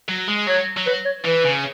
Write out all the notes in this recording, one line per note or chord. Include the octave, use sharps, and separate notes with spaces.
F#3
G#3
F#3 C#5
F#3
B4
C#5
E3 B4
C#3